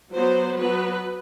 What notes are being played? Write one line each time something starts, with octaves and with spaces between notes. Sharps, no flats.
F#3 B3 C5
F#3 B3 B4